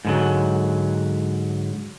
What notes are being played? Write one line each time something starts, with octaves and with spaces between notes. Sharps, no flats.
G#2 D3 F#3